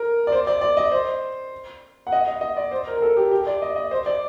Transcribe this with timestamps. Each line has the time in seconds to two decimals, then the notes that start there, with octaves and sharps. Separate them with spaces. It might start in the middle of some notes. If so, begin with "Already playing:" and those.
Already playing: A#4
0.27 D5
0.32 C5
0.47 D5
0.61 D5
0.77 D#5
0.91 C5
2.07 F#5
2.12 D#5
2.27 D#5
2.41 D#5
2.57 D5
2.71 C5
2.87 A#4
2.97 A#4
3.02 A4
3.17 G4
3.31 G4
3.47 D5
3.62 D#5
3.76 D#5
3.91 C5
4.06 D5